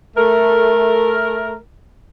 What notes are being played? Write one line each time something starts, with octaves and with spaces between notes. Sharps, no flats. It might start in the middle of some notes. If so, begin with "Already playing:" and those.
A3 A#4